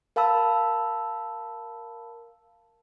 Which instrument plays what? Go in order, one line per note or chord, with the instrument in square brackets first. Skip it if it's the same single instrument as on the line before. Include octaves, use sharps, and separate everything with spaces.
[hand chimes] A#4 F5 A5 B5 E6